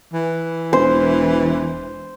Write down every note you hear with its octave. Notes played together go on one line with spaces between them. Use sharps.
E3
E1 C5